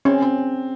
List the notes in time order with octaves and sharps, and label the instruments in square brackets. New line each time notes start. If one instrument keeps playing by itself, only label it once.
[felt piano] C4 [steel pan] C#4
[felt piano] C4